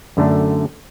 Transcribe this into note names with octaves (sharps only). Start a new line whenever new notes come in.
F#2 D3 A3 D4